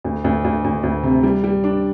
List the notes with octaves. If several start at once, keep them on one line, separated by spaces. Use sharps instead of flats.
D2
D2
D2
D2
D2
C3
G3
G3
D4